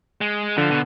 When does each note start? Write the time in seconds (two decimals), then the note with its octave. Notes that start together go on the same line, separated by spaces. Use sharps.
0.21 G#3
0.58 D3 F3
0.71 B2